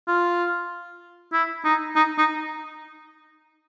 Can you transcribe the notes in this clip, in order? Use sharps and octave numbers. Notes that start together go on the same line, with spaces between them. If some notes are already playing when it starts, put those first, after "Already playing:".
F4
E4
D#4
D#4
D#4